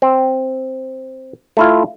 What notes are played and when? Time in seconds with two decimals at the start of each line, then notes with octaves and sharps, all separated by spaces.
0.02 C4
1.57 A3 E4 F4